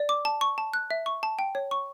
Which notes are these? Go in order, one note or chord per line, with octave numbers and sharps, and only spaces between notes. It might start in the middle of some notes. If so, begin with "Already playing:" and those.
Already playing: D5
D6
A5
C#6
A5
F#6
E5
C#6
A5
G5
C#5
C#6